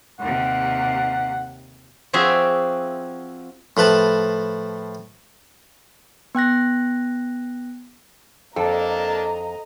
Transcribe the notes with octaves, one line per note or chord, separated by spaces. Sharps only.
D#2 C3 F#5
F3 C4 F#4 G#4 D5 E5
A2 F3 B4 A5
B3 G5 F#6 A#6
F2 A#3 D4 A4 D#5 A5 A#5